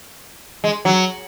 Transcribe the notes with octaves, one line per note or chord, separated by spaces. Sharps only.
G#3
F#3